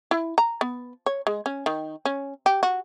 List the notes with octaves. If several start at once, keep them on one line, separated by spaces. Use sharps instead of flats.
E4
A#5
B3
C#5
G#3
C#4
D#3
C#4
G4
F#4